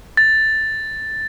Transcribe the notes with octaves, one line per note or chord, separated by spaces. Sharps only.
A6